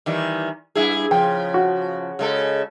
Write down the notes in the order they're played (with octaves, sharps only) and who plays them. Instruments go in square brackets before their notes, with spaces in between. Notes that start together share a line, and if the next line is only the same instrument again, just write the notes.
[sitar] D#3 E3 G3
G2 E4 G#4
[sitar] C#3 F3 [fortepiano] G5
[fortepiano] F#4
[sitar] C#3 G#3 A4